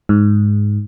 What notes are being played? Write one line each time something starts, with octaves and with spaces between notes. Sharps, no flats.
G#2